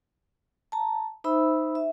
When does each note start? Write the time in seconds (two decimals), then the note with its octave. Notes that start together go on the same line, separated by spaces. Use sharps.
0.72 A5 A#5
1.24 D#4 C5 E5 B5 E6
1.75 E5